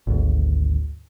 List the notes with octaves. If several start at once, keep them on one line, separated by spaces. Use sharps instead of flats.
G#1 D2